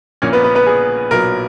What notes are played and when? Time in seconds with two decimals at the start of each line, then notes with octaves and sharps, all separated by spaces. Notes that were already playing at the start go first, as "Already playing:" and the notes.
0.22 A#1 A#2 A#3 C#4 C#5
0.33 B3 B4
0.44 B3 B4
0.55 B3 B4
0.67 G#4
1.11 B1 A#2 F#3 B3 A#4